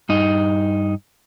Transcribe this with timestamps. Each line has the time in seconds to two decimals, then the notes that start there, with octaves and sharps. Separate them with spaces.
0.09 G2 D#4